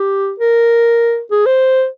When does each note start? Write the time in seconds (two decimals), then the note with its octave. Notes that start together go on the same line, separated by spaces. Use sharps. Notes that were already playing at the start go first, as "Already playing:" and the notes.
Already playing: G4
0.40 A#4
1.31 G#4
1.46 C5